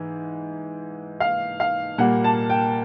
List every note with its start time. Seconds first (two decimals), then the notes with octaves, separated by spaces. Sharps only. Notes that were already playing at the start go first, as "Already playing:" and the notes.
Already playing: G#2 E3
1.20 F5
1.60 F5
1.98 A#2 G3 A#3 F#5
2.24 A5
2.50 G5